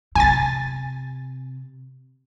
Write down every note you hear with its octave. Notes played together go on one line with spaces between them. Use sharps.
C3 G#5 A6